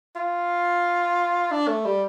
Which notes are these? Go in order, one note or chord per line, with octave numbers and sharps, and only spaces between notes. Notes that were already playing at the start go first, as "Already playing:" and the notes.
F4
D4
A3
G3